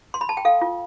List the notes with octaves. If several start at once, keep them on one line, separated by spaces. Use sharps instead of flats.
C6
B5
A5
G5
A4 F5
F4